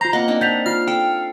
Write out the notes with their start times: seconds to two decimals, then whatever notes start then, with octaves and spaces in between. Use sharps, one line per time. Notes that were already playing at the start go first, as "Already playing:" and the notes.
0.01 F4 C5 A#5 A#6
0.13 A#3 C4 D#5 F#5
0.28 C4 D4 D#4
0.41 F#5 A5 G6 B6 F7
0.66 F4 F5 F6
0.88 A4 G5